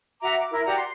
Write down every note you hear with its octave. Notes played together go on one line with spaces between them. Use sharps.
F#4 E5 A#5 D6
D6
E4 A#4
F#4 G4 D5 A#5
C6